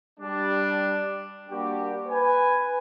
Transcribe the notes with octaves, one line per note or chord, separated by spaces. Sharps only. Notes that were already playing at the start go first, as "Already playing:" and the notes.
G3 D4
G3 A#3 D4 F#4 G4
B4 G#5